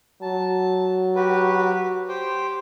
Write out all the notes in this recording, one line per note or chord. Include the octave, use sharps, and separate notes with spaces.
F#3 A5
F#4 G4 B4
G4 C5 G5